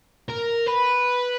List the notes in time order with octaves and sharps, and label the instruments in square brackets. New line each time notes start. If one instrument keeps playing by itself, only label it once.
[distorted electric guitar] A#4
B4